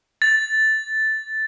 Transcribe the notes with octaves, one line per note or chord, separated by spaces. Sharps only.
A6